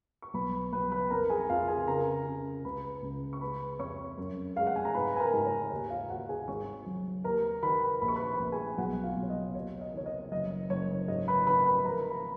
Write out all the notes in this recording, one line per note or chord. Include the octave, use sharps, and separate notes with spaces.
C#6
B1 B4 B5
B1 B4 B5
B4 B5
F2 A#4 A#5
G#4 G#5
F2 F4 F5
G#4 G#5
C#3 A#4 A#5
C#3
C#2 B4 B5
C#2
C#6
G#3 B4 B5
F2 C#5 C#6
F#2
G#3 F5
F#5
G#5
A#5
G#2 B4 B5
G#5
A#4 A#5
G#2
C#5
D#2
F4 F5
D#2 F#4 F#5
G#4 G#5
G#1 C#5 C#6
F#3
D#2 A#4 A#5
D#3 B4 B5
A#1 B5
C#6
B4 B5
A#1
G#4 G#5
B1 F#4 F#5
F4 F5
B1
C#5
D#5
D#2 C#5
D#5
D#3 C#5
D#5
F#1 D#5
F#1 C#5
G#2 D#5
B4 B5
D#3 B4 B5
B4 B5
F3 A#4 A#5
B4 B5